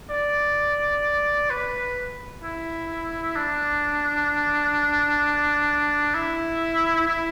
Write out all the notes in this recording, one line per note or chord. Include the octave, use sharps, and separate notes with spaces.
D5
B4
E4
D4
E4
E4